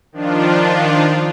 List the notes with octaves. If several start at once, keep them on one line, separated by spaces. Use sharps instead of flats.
D#3 F3 D4 F4